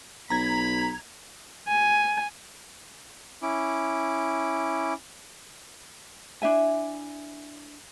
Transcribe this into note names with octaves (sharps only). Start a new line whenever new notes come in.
B1 A#5 B5 G#6
G#5
C#4 E4 D6
D4 E4 E5 G#5